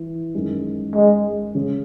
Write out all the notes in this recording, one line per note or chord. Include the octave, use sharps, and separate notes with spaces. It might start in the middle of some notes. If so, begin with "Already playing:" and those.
Already playing: E3
F#2 D#3 G#3
G#3
C#3 G#3 C#4 G#4